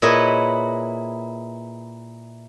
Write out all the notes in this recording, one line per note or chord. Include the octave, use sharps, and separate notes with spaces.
A#2 E4 G#4 B4 C#5 D#5